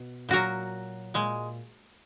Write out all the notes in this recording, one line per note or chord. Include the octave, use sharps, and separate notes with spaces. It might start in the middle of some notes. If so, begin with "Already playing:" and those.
Already playing: B2
A#2 F#3 F#4 A#4
A#2 G#3